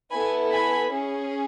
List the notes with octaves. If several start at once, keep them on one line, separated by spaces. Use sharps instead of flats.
B3 E4 A4 G#5 B5
G#5 B5
C#4 G#4